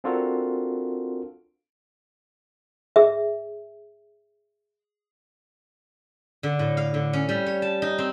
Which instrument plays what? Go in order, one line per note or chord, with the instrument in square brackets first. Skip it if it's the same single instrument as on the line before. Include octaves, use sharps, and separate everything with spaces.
[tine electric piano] C4 D4 F4 F#4 A4 A#4
[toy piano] G#4 E5
[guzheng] D3
A2
F5
D3
C#4
G3
C#5
A5
D#4
C4